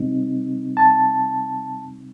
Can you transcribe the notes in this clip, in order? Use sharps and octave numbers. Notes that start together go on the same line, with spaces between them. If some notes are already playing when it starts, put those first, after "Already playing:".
Already playing: C3 G3 C4 D#4
A5